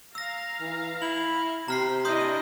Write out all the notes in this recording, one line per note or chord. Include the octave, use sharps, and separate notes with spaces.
F5 A#5 E6 A#6
E3
E4 F#7
C3 C5 A#5 F6 C7
D4 E4 D#5 C6 D#6 G6